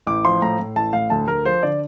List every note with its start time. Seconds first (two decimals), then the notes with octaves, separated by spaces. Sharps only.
0.07 A1 D6
0.25 F3 C6
0.42 A2 A#5
0.59 A2
0.76 A1 A5
0.93 A2 F5
1.10 D2 A5
1.28 D2 A#4
1.45 F3 C5
1.63 D3 D5